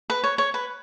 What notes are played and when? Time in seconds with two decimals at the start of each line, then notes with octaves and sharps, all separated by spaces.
0.10 B4
0.24 C#5
0.38 C#5
0.54 B4